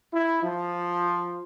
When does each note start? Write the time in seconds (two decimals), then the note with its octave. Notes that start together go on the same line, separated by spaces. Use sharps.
0.12 E4
0.43 F3